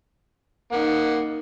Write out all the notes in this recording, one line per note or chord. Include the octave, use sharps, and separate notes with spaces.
A#3 D#4 F#5